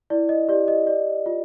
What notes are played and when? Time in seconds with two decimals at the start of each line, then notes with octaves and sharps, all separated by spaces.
0.10 E4 D5
0.29 D#5
0.49 G4 D5
0.68 D#5
0.87 D5
1.26 F4